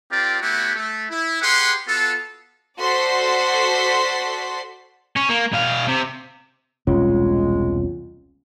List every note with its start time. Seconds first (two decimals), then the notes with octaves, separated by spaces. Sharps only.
0.11 C4 F4 G4 A#4 D5
0.41 A3 B3 E4 F#4 G4
0.75 A3
1.09 E4
1.42 G4 G#4 B4 F#5 C6
1.87 B3 F4 F#4 A4
2.79 F#4 A4 C5 D5 C6 B6
5.17 C#4
5.30 A#3
5.54 B2 F5
5.88 C3
6.87 E1 C2 A#2 G#3 C#4 F4 C#5